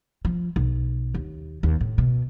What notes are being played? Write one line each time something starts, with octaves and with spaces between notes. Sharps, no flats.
F3
B1
D#2
D#2
A2
B2